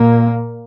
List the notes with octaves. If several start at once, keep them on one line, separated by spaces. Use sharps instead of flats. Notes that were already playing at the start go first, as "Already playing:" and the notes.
Already playing: A#2 A#3